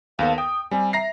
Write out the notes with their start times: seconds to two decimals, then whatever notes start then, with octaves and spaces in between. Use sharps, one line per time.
0.19 D#2 B3 A4 F5
0.38 G5 D#6
0.71 G3 C4 G#5
0.93 E5 A#5 A#6 C7